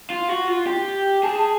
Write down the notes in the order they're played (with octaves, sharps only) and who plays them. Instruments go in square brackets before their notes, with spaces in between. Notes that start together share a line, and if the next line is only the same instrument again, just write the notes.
[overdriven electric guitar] F4
F#4
F4
G4
[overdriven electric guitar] G#4 [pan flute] A5